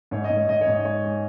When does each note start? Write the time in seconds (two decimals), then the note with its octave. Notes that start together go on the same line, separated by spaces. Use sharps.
0.11 G#2 C#5
0.24 D#5
0.30 G#2
0.37 C#5
0.49 G#2 D#5
0.61 C#5
0.67 G#2
0.73 D#5
0.85 G#3 C#5
1.04 G#3